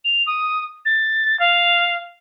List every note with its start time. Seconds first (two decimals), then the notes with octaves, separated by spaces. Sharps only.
0.04 F7
0.26 D#6
0.85 A6
1.39 F5